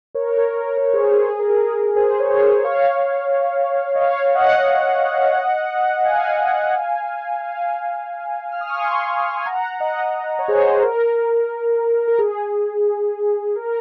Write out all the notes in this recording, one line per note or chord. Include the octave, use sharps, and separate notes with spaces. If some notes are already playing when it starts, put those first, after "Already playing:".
A#4 C#5
A#4
A#4
A#4 C#5
C#5
G#4 C5
G#4 C5
G#4
A#4
G#4
A#4
G#4 C5
C#5
G#4 C5
C#5 F5
D#5
C#5 F5
D#5 F#5
F5 G#5
F5 G#5
F6
D#6
C#6
G#5 C6
G#5
F#5 A#5
D#5 F#5
C#5
G#4 C5
A#4
A#4
G#4
A#4